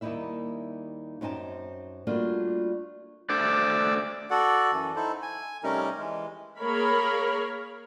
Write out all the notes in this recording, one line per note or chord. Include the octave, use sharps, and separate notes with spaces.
D#2 G3 A#3 D#4 E4 E5
F#2 C4 D#4 G#5 A5
G3 A3 A#3 D4 F4 F#4
A3 D4 C5 D5 D6 E6
F#4 A4 D5 F#5
F#2 E3
D#4 E4 A4 C5
G#5
C3 G3 A3 C#4 D#4 A#4
E3 G#3
A#3 G#4 A#4 C#5 B5